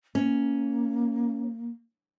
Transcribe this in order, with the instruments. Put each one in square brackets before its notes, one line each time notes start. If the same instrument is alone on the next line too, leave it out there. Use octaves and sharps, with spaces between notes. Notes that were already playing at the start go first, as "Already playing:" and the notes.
[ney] A#3 [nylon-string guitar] C#4